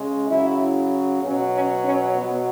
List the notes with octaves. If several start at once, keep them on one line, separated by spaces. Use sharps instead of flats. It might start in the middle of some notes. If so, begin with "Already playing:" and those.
Already playing: C#3 G#3
C#3 F#3 E4
B2 F#3 C#4
C#4
C#4
B2 F#3 B3